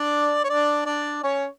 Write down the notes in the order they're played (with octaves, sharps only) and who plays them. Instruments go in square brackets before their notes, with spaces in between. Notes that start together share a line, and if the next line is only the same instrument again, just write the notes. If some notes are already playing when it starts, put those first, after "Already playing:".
Already playing: [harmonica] D4 D5
C#5
D4 D5
D4 D5
C#4 C#5